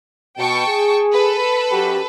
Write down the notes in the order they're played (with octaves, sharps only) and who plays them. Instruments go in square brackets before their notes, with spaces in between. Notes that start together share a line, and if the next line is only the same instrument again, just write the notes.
[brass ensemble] B2 [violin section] G5 A5 C#6
[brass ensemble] G#4
[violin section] A4 B4
[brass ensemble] F#2 F#4 G4